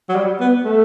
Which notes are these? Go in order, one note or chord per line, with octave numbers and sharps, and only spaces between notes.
F#3
G3
B3
A3